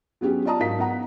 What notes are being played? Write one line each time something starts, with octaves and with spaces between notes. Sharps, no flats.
F#3 B3 C#4 G4 G#4
F4 D5 D#5 A5 A#5 D#6
G#2 F#3 D#4 A#4 F5 B6
B3 D#4 F#5 A#5